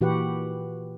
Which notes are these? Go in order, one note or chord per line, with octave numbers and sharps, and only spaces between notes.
A#2 E3 F#4 G4 B4 F#5